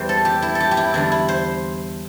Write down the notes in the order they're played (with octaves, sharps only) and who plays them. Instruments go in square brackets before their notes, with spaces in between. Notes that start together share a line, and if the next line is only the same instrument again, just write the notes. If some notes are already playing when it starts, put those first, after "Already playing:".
Already playing: [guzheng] E2 E3 G3 C5
A4
G4
E4
A4
G4
G4
E4
E2 D3 G3 E4
E4
C5